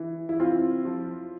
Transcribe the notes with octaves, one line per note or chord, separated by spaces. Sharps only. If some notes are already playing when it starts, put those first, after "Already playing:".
Already playing: E3
E4
C4 F4
F3